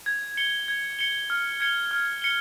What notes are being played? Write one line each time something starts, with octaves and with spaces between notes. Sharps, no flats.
G#6
C#7 G7
G#6
C#7 G7
F6
G#6 C#7 G7
F6
C#7 G7